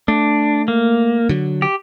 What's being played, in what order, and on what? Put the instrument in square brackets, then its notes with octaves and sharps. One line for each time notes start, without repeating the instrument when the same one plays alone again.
[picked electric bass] A3 [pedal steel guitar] D4
[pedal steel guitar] A#3
[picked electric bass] D3 F#3
[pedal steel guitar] G4